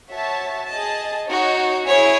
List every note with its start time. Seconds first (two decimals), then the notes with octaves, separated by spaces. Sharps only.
0.10 F#4 C#5 E5 A5
0.69 G#4 D#5 A5
1.28 D#4 F#4 C#5
1.86 E4 G#4 C#5 G#5